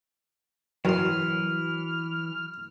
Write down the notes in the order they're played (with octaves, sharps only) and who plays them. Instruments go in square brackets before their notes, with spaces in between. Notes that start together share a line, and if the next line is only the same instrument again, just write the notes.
[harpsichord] F#2 C6 [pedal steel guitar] E3 [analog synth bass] F#3 [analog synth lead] F6